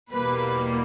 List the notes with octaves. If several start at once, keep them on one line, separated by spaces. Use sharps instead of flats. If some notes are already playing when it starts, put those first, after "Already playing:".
E2 B2 G3 A#3 B4